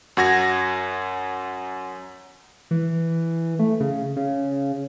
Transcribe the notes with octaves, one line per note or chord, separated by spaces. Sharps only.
F#2 F#4 G#6 A#6
E3
A3
C#3
C#3